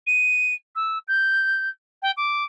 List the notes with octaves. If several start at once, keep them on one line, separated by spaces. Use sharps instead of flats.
D#7
E6
G6
G5
D6